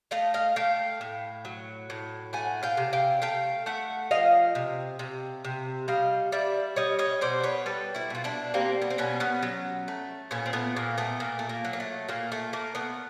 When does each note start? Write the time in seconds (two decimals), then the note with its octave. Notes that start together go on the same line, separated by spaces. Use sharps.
0.11 A3 D#5 F5
0.34 D#5 F5
0.56 A3 F5 G5
1.01 A2
1.45 F#3
1.90 A2
2.33 A3 F#5 G#5
2.63 F5 G5
2.77 C3
2.93 F5 G5
3.22 A3 F5 G5
3.66 A3 E5 F#5
4.11 F3 D#5 F5
4.55 C3
4.99 C3
5.45 C3
5.88 G3 D#5 F5
6.32 G3 D5 E5
6.76 G3 C#5 D#5
6.99 C#5 D#5
7.21 B2 C5 D5
7.43 B4 C#5
7.66 G3 A4 B4
7.95 E4 F#4
8.10 B2 F4
8.24 D4 E4
8.54 G3 A#3 C4
8.82 B3
8.90 C4
8.98 B2 B3 C#4
9.20 B3 C#4
9.43 F#3
9.88 A3
10.31 A#2 B3 C#4
10.46 C4
10.53 A3 B3
10.76 A#2 A#3
10.98 A3 B3
11.20 A#2 A#3
11.39 A3
11.49 A#3
11.65 F#3
11.73 A#3
11.80 A3
12.09 A#2 A#3
12.32 A3
12.53 A3 A#3
12.75 A3 B3